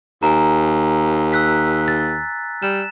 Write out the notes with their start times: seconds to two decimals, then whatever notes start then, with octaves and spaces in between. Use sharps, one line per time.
0.23 D#2 G#5 A#5
1.33 E6 F#6 B6
1.88 A6
2.63 G3 E7